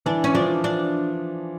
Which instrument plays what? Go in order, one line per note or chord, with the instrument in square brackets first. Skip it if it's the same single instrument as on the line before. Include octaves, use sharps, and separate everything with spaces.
[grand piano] E3 [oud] D4
[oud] C#4
[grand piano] F3 [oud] D4
[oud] D4